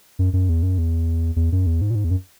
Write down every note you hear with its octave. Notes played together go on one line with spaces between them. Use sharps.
F#2
F#2
E2
F#2
E2
E2
F#2
E2
G#2
A#2
G#2
E2
F#2